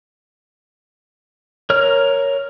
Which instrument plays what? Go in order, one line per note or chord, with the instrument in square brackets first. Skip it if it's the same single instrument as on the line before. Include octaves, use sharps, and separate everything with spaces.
[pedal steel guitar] A#4 C#5 F6